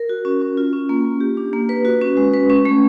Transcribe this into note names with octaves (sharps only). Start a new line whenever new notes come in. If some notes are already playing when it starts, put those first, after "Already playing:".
Already playing: A#4
F#4
C#4
C#4
F4
C#4
A#3
A#3
G4
D4
A#3
B4
F#4
C#4
G#3
B4
C#4
A3